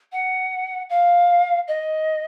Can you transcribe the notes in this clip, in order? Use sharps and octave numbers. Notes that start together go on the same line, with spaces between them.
F#5
F5
D#5